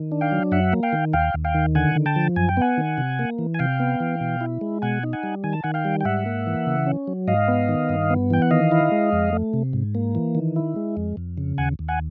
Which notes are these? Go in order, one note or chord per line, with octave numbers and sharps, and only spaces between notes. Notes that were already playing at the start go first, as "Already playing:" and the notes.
Already playing: D#3
D4
F5 G5
F#3
F#2 E5 F#5
A#3
F5 G5
D#3
D#2 F5 G5
D#2
F5 G5
D#3
D3 F#5 G#5
D3
G5 A5
F3
F#2 G#5
G5
B3 F#5 G#5
D#3
C3
A#3
E3
G#5
C3 F5 G5
B3
E3
B2
E4
G#3
B2 F#5 G#5
D#4
F#5 G#5
G3
D#3 G#5
A5
D#3 F#5 G#5
F5 G5
G3
G5
G#2 E5 F#5
A#3
E3
C#3
C#4
F#3
G#2 D#5 F5
B3
D#3
G2
B3
E3 G5
F#5
D#3 D#5 F5
E4
G#3
F2
A3
C3
G#2
A#3
E3
D#3
E4
G#3
F2
F2
C#3
D#2 F#5 G#5
D#2
F#5 G#5